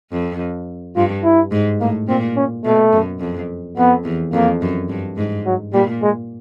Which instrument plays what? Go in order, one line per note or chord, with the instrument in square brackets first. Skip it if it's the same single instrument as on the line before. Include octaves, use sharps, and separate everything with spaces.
[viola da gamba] F2
[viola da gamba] G2 [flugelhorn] F4
[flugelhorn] E4
[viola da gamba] G#2
[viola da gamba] A2 [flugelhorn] A#3
[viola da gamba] A#2 [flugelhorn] C4
[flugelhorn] C#4
[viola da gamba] B2 [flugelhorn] A3
[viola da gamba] F#2
F2
[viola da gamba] F2 [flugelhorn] B3
[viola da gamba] E2
[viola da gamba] F2 [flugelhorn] A#3
[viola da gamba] F#2
G2
G#2
[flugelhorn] F#3
[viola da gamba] A#2 [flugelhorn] G3
[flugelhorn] G#3